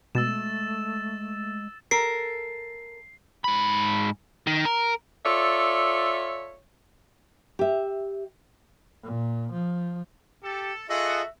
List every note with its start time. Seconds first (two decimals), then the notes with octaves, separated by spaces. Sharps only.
0.15 B2 G#3 A3 E6 A6 E7
1.91 A4 A#4 C7
3.44 G#2 B5
4.47 D#3
4.65 A#4
5.24 F4 A4 C#5 D5 E5
7.59 G4 E5
9.03 A#2
9.52 F3
10.43 G4 A4
10.90 F4 F#4 G#4 A4 D#5 E5